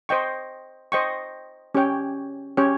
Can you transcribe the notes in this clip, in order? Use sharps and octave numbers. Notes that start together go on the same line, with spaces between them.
C5 D#5 G5 C#6
C5 D#5 G5 C#6
C#4 G4 C#5 G5
C#4 G4 C#5 G5